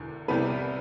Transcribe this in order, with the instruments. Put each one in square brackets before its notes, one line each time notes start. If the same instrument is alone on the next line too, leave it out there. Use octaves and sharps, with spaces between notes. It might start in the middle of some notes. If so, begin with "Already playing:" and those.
Already playing: [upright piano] E1 E2 D3
C2 C3 G3 B3 B4